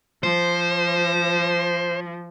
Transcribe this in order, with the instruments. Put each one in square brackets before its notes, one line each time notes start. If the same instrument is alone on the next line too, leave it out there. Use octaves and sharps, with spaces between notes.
[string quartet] F3 [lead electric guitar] C5